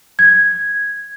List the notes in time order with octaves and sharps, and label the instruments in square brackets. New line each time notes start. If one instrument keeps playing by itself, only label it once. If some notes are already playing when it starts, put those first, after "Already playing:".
[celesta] G#6